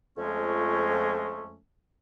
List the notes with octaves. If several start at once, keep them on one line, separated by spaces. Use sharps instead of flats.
F2 F3 G#3 A3 C#4